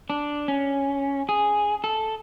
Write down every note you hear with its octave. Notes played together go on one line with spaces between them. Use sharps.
D4
C#4
G#4
A4